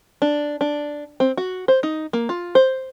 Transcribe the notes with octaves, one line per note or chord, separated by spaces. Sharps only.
D4
D4
C4
F#4
C5
D#4
A#3
F4
C5